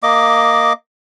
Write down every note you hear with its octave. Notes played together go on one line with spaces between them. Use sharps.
A#3 D#5 D6